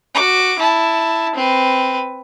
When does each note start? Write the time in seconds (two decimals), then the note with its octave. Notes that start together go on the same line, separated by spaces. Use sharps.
0.15 F#4 D6
0.59 E4 A5
1.35 C4 B4